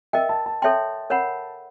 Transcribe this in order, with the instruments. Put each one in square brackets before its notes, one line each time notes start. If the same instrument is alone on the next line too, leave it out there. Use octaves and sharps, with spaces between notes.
[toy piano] A#4 D#5 G5 [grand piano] E5
[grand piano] A5
A5
[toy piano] A4 C#5 E5 G5 C6 [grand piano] A5
[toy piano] A#4 C#5 F#5 B5